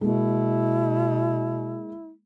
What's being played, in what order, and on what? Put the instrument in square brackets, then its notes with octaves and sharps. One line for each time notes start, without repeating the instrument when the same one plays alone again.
[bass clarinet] B2 [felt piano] G#3 A#3 [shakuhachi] E4